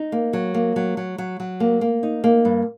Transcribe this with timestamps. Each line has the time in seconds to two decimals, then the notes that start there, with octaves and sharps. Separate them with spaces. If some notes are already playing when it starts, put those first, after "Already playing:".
Already playing: D#4
0.12 A#3
0.33 F#3
0.54 A#3
0.76 F#3
0.97 F#3
1.18 F#3
1.40 F#3
1.60 A#3
1.81 A#3
2.03 D#4
2.24 A#3
2.45 G2